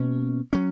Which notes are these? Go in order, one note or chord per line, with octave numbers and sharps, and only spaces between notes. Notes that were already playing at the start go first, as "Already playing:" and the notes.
Already playing: B2 A#3 C#4
F#3 C#4